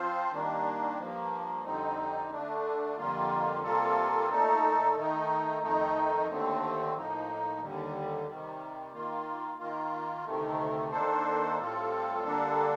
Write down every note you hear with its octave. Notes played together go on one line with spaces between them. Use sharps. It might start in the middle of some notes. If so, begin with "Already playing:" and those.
Already playing: F3 C4 F4 C5
D#3 G3 A#3 D4
G2 F3 A#3
F2 D3 G3 C4 D#4
D3 A3 D4
F2 D3 G3 A#3 F4
C3 G3 A#3 F4 A4
A#2 A3 D#4 A4
D#3 A3 D#4
F2 D#3 A3 D#4
D#2 D3 A3 C4
A2 F3 A#3 D#4
D#2 D3 G3
C3 D#3 G3
D#3 A#3 F4
D#3 A#3 F4
D2 C3 D#3 A3
D#3 A#3 D4 A4 C5
A2 G3 C4 F4 A4
D3 G3 A#3 D4 A4